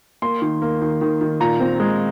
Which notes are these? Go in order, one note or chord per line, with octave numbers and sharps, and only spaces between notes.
A#3 C6
D#3
A#3
D#3
D#3
D#3
A#2 A#5
C4
G#3